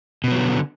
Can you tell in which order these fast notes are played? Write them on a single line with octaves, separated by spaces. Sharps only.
B2 B3 F#3 F3 D3